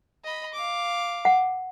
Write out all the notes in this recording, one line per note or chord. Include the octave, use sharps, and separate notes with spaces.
D#5 B5
F5 D6
F#5